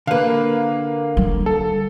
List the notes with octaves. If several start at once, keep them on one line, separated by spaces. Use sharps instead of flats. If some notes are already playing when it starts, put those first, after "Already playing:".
D3 A#3 B4 F5
G3
A4